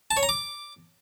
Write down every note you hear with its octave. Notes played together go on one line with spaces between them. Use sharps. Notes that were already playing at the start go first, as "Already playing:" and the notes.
A5
C#5
A#5
D6